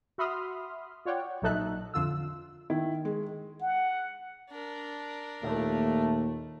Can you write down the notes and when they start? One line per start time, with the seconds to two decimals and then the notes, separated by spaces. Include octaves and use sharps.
0.18 F#4 E5 B5 C6 D#6 F6
1.05 F4 C#5 D5 F#5 G5
1.42 A#1 F#3 D#4 A4 E5 F#6
1.94 F2 D3 F4 E6
2.70 D#3 E4
3.05 G#3
3.61 F#5
4.50 D4 A#4
5.43 D#2 A#2 A3